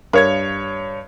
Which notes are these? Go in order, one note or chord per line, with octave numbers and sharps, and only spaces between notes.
G2 A#4 C#5 E5 F5 G#6